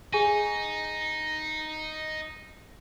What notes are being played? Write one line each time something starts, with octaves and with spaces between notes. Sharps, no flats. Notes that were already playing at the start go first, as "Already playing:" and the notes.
D#4 G#4 G#5 D#7